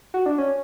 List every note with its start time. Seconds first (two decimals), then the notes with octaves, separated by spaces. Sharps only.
0.14 F#4
0.26 D4
0.38 C#4